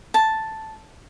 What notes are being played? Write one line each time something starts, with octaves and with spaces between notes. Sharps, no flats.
A5